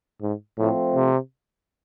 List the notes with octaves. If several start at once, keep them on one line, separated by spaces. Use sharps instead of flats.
G#2
A2 F3 A3 C4
C3